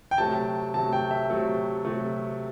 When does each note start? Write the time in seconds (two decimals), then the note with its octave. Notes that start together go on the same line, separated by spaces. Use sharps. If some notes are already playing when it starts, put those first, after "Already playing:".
0.11 G5
0.18 C3 F#3 A3 A5
0.74 C3 F#3 A3 A5
0.93 G5
1.11 E5
1.30 C3 F#3 A3
1.85 C3 F#3 A3